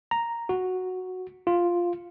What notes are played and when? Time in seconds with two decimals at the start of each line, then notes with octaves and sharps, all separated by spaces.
0.11 A#5
0.49 F#4
1.47 F4